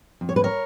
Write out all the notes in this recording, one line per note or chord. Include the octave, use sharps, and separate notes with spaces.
F2
C#5
B4
A#4 C#5